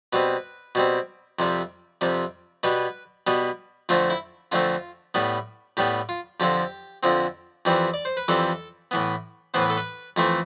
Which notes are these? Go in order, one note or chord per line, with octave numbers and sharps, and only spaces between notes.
B2 G3 C4 B4
B2 G3 C4
F2 C3 G3
F2 C3 G3
B2 G3 B3 B4
B2 G3 B3
F2 D3 A3 C4 F4
E4
F2 D3 A3 C4 F4
A2 G3 B3
A2 G3 B3 G4
F4
F2 D3 F3 C4 G4
F2 D3 F3 C4
F2 E3 G3 C4
D5
C5
B4
F2 E3 G3 C4 A4
A2 E3 B3
A2 E3 B3 C5
B4
A4
B4
F2 E3 A3 C4